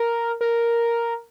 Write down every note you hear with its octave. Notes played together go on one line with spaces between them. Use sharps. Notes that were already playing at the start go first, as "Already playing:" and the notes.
Already playing: A#4
A#4